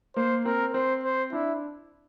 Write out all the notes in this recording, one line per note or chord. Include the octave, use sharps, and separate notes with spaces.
A#3 C5
C4 A#4
C4 C5
C5
D4 E4